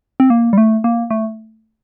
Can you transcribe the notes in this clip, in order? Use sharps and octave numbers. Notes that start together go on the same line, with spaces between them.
C4
A#3
G3
A3
A#3
A3